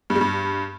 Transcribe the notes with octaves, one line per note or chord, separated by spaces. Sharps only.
G2
G3
G2